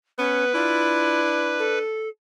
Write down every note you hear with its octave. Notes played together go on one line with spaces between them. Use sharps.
B3 C#4 B4
D4 E4 F4
A4